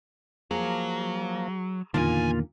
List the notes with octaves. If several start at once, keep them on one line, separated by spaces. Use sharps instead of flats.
F3 F#3 A#3 G#4
E2 A#2 D3 D#3 A#3 D4 F4 G#5